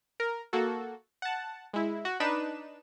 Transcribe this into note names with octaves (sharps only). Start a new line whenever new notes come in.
A#4
A#3 F#4 A4
F#5 A5
G#3 E4
F#4
D4 D#4 B4 E7